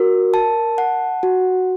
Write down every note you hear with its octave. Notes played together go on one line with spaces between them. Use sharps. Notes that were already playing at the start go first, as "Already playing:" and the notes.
Already playing: F#4 A#4
A5
F#5
F#4